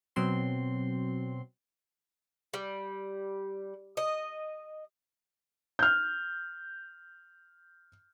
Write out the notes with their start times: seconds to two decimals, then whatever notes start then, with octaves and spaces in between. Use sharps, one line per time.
0.16 B2 F#3 C4 C6
2.54 G3
3.97 D#5
5.79 F6 G6